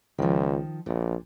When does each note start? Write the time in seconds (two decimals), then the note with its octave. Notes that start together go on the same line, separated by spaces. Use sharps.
0.18 C#2 D#3 F3
0.86 A#1 A#2